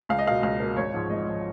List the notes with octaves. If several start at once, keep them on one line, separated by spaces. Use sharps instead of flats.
C#2 F5
D#5
B2 A#3 F5
C#2 F5
B2 A#3
G#1 C#5
G#2 F3
G#1 D#5
G#2 F3